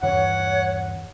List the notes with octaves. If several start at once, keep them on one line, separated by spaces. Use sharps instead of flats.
D#1 G2 E3 C#5 F#5